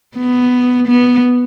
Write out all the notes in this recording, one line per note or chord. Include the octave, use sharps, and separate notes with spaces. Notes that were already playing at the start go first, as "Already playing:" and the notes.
B3
B3